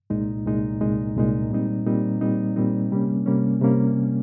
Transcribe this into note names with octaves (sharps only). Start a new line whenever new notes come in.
C2 A#2 G#3 D#4
C2 A#2 G#3 D#4
C2 A#2 G#3 D#4
C2 A#2 G#3 D#4
A#2 G3 C4 D#4
A#2 G3 C4 D#4
A#2 G3 C4 D#4
A#2 G3 C4 D#4
C3 G3 A#3 C#4
C3 G3 A#3 C#4
C3 G3 A#3 C#4